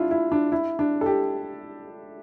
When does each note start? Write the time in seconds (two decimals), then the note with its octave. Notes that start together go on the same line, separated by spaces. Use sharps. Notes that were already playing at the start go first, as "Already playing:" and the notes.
Already playing: D4 E4 F4
0.11 E4
0.32 D4
0.52 E4
0.79 D4
1.01 A4
1.06 G4